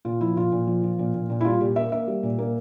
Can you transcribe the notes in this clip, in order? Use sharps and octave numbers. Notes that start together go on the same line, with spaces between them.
A#2 F4
F3 E4
A#2 F4
A#2
F3
F3
A#2
A#2
A#2
E4
G3 F4
A#2 G4
A#3 E5
A#3 E5
G3
A#2
A#3